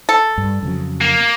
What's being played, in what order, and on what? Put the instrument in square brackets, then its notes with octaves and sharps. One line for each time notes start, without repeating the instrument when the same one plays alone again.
[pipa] A4
[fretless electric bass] G2
F2 C#3 F#3
[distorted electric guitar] A#3